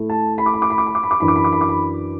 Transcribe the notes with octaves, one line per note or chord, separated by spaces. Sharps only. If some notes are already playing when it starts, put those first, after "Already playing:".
Already playing: A2 A3 E4
A5
B5
D6
B5
D6
B5
D6
B5
D6
B5
D6
F#2 E3 D4 B5
D6
B5
D6
B5
D6
B5